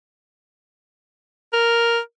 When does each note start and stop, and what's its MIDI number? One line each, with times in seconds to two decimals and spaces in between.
1.53 1.99 70